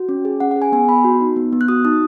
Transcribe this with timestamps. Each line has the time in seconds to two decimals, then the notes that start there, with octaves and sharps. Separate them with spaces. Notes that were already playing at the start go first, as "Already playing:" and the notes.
Already playing: F#4
0.09 C#4
0.25 G#4
0.40 C#4 F#5
0.51 F#5
0.56 G#4
0.62 G#5
0.72 B3 G#5
0.88 B3 B5
1.04 F#4
1.21 D#4
1.36 B3
1.53 B3
1.61 F#6
1.68 F#4 D#6
1.85 D#4 D#6